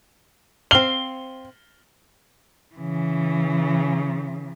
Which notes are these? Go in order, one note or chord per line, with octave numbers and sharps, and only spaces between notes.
C4 F5 G7
C#3 E3